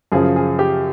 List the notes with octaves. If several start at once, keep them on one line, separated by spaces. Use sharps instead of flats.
F#2 C#3 F3 G#4
G#4
G4